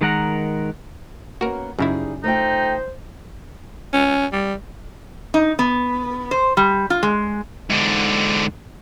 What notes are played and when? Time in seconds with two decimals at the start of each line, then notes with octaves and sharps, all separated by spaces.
0.01 D#3 G#3 A#4 F#5 A#5
1.41 A#3 B3 C#4 F#4 A#4
1.79 F#2 C#3 G3 D#4 E4 G#4
2.24 A3 D#4 F4 C5 G5
3.93 C#4
4.33 G3
5.34 D#4
5.59 B3
6.31 C5
6.57 G3
6.90 F4
7.03 G#3
7.70 G#2 D3